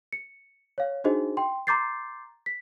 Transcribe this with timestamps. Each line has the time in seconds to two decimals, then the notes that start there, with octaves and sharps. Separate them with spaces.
0.13 C#7
0.78 C#5 F5
1.04 D4 D#4 F#4 G#4 C5 D#5
1.37 G5 C6
1.67 A#5 C6 D6 G6 A6 C7
2.46 B6